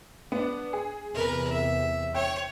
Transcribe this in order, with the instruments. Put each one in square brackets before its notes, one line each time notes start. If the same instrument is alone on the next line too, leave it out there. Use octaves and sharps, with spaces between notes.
[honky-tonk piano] B3 D4
G#4
[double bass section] E2 C3 [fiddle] A#4 B4
[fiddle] E5
[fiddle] C#5 [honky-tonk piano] G5